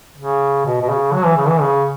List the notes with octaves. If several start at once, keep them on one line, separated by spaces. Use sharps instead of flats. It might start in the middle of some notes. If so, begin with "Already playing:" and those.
C#3
B2
B2
C#3
F#3
E3
C#3
E3
C#3